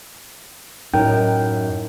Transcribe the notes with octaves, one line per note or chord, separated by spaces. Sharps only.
F#2 A2 D#4 A#4 G5